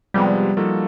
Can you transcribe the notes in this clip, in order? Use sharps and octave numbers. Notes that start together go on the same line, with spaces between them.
C3 F3 G3 G#3 B3
F3 A#3 D#4 F#4 A4